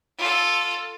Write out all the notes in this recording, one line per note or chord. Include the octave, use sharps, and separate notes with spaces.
F4 A4